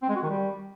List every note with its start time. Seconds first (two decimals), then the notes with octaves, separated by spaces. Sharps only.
0.02 C4
0.09 G#3
0.16 F#4
0.23 D#3
0.29 G3